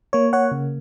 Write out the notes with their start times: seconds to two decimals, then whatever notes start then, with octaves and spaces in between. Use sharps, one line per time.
0.13 A#3 C#5
0.33 C#5 F#5
0.52 C#3